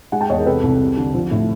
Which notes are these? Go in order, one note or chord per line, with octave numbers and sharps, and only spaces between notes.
G#3 F#5 G#5
G5 A5
E2 C#5 D#5
G#4 A#4
C3 A4 B4
C2
G3
D3
F3
A2